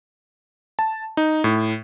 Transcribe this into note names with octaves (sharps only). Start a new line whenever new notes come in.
A5
D#4
A2